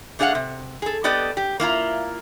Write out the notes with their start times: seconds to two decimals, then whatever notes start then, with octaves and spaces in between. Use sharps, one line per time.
0.19 A3 D4 G#4 D5 F5 F#5
0.35 C3
0.82 G#4 A4
1.04 B3 G4 A4 D5 D#5
1.37 G4
1.60 A#3 E4 F4 A#5